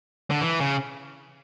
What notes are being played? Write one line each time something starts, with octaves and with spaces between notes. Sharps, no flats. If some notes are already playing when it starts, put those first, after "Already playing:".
D3
E3
C#3